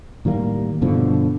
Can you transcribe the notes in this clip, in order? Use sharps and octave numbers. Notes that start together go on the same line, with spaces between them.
A2 D#3 G3 A#3
G2 B2 D3 F3